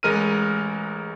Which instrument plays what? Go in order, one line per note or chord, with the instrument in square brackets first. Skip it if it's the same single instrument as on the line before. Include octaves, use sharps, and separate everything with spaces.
[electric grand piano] A1 G#3 A#4 F6 D#7